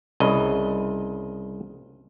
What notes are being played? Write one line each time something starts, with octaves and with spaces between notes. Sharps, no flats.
C2 C#3 D#5